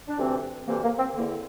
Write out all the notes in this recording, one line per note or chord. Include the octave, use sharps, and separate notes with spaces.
D4
D2 C3 E3 C4
D2 C3 E3 A#3
A#3
C4
E2 D3 A#3